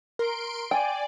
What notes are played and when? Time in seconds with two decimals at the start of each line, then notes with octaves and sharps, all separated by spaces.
0.19 A#4 C6 D7
0.71 D5 G5 G#5